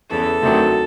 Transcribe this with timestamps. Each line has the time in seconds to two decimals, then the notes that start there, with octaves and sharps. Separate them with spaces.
0.09 E2 C#3 E3 A4
0.42 D2 C3 D#3 F#3